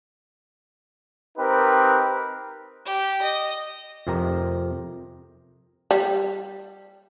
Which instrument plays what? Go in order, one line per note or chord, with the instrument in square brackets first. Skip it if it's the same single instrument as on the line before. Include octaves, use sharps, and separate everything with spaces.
[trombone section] C4 D#4 G4 A#4 B4
[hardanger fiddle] G4
D#5
[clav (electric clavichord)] F2 C3 G4 A#4 A#5
[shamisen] G3